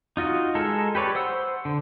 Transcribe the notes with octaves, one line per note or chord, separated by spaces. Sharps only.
D#4 F4 F#4 D#5
G#3 A4 A#4
G4 B4 C#5 D5
C5 F#5 E6
D3